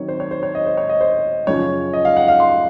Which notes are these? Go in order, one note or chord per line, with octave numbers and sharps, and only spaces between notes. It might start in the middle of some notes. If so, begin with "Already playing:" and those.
Already playing: D#3 F#3 C4 D#4 C#5
C5
C#5
C5
C#5
D#5
C5
C#5
D#5
C5
F#2 C#3 F3 C#5
D#5
F5
F#5
F5
C6